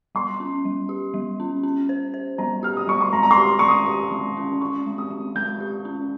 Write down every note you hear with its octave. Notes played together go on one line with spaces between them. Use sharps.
G3 C6
C#4
G3
G4
G3
C#4
C#4
C5
C5
G3 A#5
G4 F6
D#6
G3 C#6
C6
G#3 A#5
A#5
C6
G4
G#3 C#6
D#6
G4
G#3
C#4
C#4 C#6
G#3
D#6
G#3
G#3 G6
G4
C#4